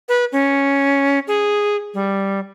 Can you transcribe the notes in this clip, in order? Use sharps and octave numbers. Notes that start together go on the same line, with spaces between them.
B4
C#4
G#4
G3